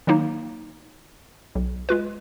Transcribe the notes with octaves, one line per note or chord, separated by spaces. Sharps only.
D#3 F#3 A#3 D#4
B1
G#3 F4 B4